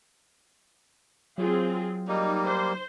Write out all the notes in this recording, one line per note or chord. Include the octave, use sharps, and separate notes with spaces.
F#3 C4 F4 G#4
G3 A#3 D#4
C5